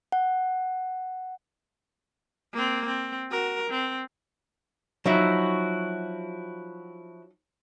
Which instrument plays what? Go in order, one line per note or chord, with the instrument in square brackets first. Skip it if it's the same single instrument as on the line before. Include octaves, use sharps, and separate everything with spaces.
[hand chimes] F#5
[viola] A#3 C4
C4
F#4 A#4
C4
[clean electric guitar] F3 E4 F#4 [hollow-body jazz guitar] F#3 D#4 E5